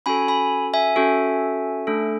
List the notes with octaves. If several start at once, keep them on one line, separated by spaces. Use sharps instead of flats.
C#4 F#4 A4 G#5 B5
G#5 B5
E5 G#5
C#4 F#4 A4
A3 D4 A4